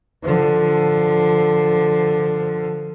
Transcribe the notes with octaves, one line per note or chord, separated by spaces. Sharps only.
D3 F3